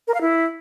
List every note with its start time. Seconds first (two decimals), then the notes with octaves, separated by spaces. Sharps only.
0.08 A#4
0.14 F5
0.21 E4